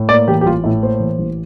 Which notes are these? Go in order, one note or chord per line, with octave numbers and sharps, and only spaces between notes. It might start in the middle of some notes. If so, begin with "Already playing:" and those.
Already playing: A2
A#3 D5
E3 G4
G4
A1 F4
A2 E4
A#3 C5
E3
A1